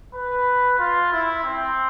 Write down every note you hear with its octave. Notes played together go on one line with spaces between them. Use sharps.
B4
F4
E4
C4